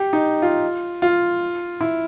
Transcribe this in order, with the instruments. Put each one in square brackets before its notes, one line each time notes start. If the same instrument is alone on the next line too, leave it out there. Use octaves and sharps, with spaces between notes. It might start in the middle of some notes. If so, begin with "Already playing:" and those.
Already playing: [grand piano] G4
D#4
F4
F4
E4